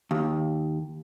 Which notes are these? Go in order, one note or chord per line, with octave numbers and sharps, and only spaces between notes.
D#2